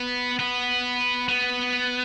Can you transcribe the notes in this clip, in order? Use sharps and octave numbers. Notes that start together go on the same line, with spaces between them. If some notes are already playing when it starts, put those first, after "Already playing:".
Already playing: B3
B3
B3